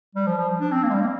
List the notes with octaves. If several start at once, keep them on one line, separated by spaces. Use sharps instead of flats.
G3
F3
F3
D4
C4
A#3
G#3
G3
A#3